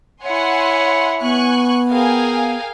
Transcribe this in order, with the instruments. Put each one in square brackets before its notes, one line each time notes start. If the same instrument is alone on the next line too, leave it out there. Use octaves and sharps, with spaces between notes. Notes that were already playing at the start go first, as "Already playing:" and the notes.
[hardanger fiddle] E4 C#5 [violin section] F#5 G#5 C6
[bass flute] B3 [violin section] G#5 C#6 F#6
[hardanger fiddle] G#4 A#4 [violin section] F5 G5 G#5